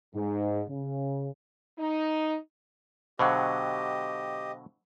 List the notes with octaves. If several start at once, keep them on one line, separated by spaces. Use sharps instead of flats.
G#2
C#3
D#4
B2 D3 F#3 G4 C5 D#5 F5 G5